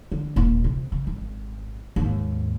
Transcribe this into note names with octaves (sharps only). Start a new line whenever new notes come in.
D3
D#1 A#2
C3
C#3
G#1
D#2 G#2